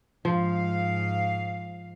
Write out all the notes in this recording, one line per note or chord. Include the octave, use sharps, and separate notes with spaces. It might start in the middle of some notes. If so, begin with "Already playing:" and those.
G#2 F3 F5